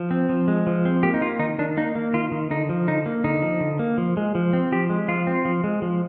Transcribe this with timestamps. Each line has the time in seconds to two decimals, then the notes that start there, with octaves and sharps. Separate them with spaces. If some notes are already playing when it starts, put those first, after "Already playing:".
Already playing: F3
0.11 C4
0.29 F3
0.48 G#3
0.67 F3
0.85 C4
1.03 A#3 G4
1.14 D#4
1.21 A#3 F4
1.40 D#3 D#4
1.59 D#3 D4
1.77 A#3 D#4
1.95 A#3
2.14 D#3 F4
2.32 D#3
2.51 D3 D#4
2.69 F3
2.87 D3 D#4
3.06 A#3
3.24 D3 D#4
3.42 F3
3.61 D3
3.79 A#3
3.98 F3
4.17 G#3
4.35 F3
4.53 C4
4.72 F3 G4
4.90 G#3
5.08 F3 F4
5.27 C4
5.45 F3
5.64 G#3
5.82 F3